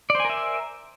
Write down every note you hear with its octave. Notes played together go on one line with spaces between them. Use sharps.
A#4 C5 D5 E5 G#5